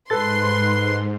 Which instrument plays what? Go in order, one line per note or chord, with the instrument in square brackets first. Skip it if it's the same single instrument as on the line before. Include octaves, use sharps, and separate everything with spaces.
[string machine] G#2 [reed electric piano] A4 A6 [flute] B4 [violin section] C6